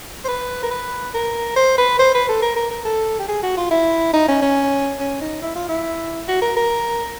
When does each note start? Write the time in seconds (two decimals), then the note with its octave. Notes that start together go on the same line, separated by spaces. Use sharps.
0.25 C5
0.28 B4
0.63 A#4
0.71 B4
1.14 A#4
1.56 C5
1.78 B4
1.99 C5
2.15 B4
2.29 A4
2.42 A#4
2.56 A#4
2.71 A#4
2.85 A4
3.19 G4
3.28 G#4
3.43 F#4
3.57 F4
3.71 E4
4.14 D#4
4.29 C#4
4.42 C#4
5.00 C#4
5.21 D#4
5.42 E4
5.56 F4
5.69 E4
6.28 F#4
6.42 A#4
6.57 A#4